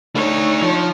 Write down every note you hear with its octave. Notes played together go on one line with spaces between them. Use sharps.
A3 D4 D#4 C#5
F3